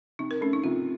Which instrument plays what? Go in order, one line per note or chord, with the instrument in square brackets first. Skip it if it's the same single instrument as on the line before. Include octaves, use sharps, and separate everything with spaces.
[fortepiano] C3 [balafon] D#4
[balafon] A#4
[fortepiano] A3 [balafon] C#4
[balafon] D#4
[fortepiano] C3 [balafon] F4